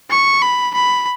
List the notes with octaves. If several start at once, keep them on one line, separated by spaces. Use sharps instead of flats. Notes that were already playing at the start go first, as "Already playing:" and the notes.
C#6
B5
B5